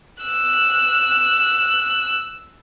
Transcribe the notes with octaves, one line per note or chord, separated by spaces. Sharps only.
E6 F#6